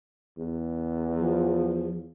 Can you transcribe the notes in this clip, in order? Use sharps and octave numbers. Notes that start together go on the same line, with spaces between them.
E2
F3